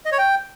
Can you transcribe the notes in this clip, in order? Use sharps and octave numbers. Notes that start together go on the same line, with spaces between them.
D#5
C#5
G5